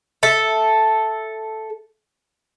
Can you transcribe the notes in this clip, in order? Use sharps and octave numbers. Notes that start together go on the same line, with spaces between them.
A4 E5